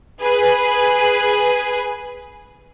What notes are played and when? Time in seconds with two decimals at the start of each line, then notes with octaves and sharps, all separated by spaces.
0.21 G#4 B4